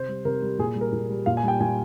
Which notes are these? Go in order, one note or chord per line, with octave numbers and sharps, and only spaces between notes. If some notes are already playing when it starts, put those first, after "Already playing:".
Already playing: C3 C5
G3
C3 A#4
G3
A#2 G#4
G3
A#4
A#2
G3
A#2 F5
G#5
G3 G5
A#2 G#5